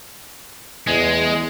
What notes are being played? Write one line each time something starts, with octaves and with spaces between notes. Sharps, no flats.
E2 G#3